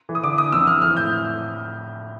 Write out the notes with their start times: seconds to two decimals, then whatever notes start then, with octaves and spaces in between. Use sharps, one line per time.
0.09 E3
0.15 D#6
0.23 D3 D6
0.38 D3 D#6
0.52 F2 E6
0.67 E3 F6
0.82 E3 F6
0.97 A2 G6